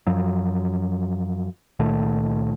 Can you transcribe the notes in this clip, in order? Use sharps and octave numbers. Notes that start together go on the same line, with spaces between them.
F#2 F3 F#3
C#2 A#2 D#3 A3